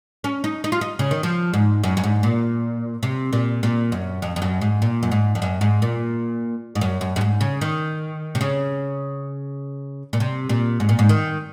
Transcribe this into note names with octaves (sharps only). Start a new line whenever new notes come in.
C#4
D#4
D#4
F4
D#4
C#3
D#3
F3
G#2
F#2
F#2
G#2
A#2
C3
A#2
A#2
F#2
F2
F2
F#2
G#2
A#2
F#2
G#2
F2
F#2
G#2
A#2
G#2
F#2
F#2
F#2
G#2
C#3
D#3
C3
C#3
A#2
C3
A#2
G#2
A#2
G#2
D#3